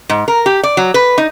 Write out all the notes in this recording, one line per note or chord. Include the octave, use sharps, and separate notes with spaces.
G#2
A#4
G4
D5
F#3
B4
D#4